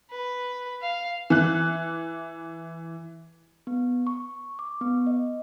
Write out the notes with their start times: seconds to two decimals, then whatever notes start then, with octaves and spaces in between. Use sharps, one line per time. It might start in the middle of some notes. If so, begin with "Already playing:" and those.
0.11 B4
0.81 F5
1.30 E3 F#6
3.67 B3
4.07 C#6
4.59 D6
4.81 B3
5.07 D#5